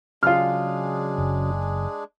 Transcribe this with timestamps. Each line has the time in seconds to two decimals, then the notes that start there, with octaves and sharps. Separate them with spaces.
0.23 C#3 F#3 G#3 D4 F4 G#4 F6
1.18 F#1